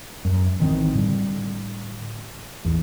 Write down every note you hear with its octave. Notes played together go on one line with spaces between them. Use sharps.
F#2
A1 D#3 E3 C4
A2 D3 G3
A1 E2